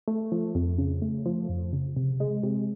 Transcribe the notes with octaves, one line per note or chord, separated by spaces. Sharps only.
A3
F3
F2
C#3
A3
F3
F2
C#3
C3
G#3
C3